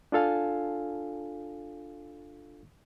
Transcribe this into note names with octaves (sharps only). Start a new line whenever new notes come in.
D4 F4 A4 F5 G#5